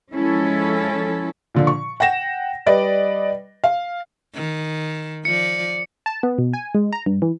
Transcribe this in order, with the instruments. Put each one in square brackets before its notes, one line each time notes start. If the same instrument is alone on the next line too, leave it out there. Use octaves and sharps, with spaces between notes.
[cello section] F3 G#3 C#4 E4 A4
[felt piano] A#2 D3 F3
C#6
F#5 G5 A#6 E7
G3 B4 D5 D#5
F5
[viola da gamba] D#3
[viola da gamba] F3 D5 [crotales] C#7
[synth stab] A5
B3
B2
G#5
G#3
A#5
G2
E3